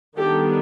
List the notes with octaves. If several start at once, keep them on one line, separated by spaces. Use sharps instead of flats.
D#3 G3 B3 D4 G4 A4